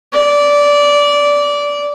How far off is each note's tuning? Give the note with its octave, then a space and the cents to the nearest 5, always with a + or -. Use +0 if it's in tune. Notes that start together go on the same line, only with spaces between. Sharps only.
D5 -15